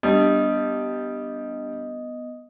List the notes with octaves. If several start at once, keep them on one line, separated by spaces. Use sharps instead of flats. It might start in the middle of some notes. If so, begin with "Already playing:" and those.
G3 B3 D4 D#5 D#6